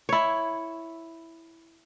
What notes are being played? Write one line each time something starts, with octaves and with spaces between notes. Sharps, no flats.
E4 C#5